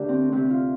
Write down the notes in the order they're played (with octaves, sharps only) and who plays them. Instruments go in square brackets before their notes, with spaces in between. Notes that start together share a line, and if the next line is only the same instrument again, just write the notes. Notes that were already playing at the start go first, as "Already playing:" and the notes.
Already playing: [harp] D2 D3 D4 G4 A#4
C4
D2 C3 C4
F4